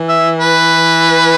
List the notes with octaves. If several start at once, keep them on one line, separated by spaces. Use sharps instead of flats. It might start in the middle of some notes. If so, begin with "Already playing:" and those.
Already playing: E3
E5
B4